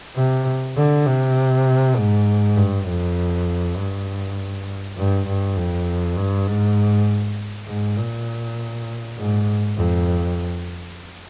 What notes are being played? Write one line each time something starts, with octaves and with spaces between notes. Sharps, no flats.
C3
D3
C3
G#2
G2
F2
G2
G2
G2
F2
G2
G#2
G#2
A#2
G#2
F2